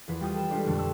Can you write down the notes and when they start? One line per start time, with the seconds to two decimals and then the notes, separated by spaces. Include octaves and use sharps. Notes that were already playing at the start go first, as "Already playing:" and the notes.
0.08 E2 F3 B4
0.20 G3 F4 G5 D#6
0.34 A4 E7
0.51 G3 G#3 D4 F4 G4 D5
0.65 A#1 F2 D3
0.79 E6